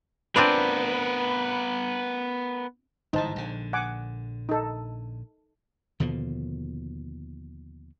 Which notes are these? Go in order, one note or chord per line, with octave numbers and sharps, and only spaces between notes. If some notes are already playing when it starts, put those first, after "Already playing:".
B3 C4 D4 F4 A#4 B4
G1 G#2 E3 D#4 C5 A5
A#1 D3
F#5 G#5 D6
D#4 A4
D#2 B2 D3 F3